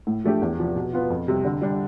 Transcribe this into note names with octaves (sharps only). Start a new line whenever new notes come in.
A2
F3 A3 D4 G4
E2
C3 F3
B2
B3 F4
F2
C3 G3
D3
G3 D4